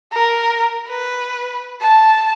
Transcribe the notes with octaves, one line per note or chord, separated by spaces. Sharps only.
A#4
B4
A5